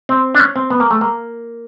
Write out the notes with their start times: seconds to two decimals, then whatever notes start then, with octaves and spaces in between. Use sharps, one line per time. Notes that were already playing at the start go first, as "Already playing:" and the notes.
0.09 C4
0.35 D4
0.39 C#4
0.56 C4
0.70 B3
0.80 A#3
0.91 A3
1.01 A#3